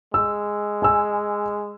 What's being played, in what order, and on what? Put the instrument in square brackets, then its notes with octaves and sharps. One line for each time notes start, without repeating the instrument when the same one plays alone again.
[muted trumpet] G#3 [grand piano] E6
[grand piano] G#5 E6